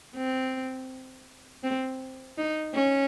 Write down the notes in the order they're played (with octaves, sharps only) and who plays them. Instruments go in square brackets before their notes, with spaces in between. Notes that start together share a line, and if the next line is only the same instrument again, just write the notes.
[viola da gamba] C4
C4
D#4
C#4